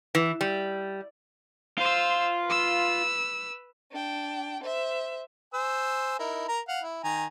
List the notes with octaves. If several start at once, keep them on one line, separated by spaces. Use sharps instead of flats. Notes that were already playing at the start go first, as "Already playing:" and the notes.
E3
G3
F4 C5 E6
B4 E6
D4 G5
C5 E5
C5 G#5 E6
D#4 E4 A#4
A#4 A#5
F5 F#5
E4
D#3 G#5 A#5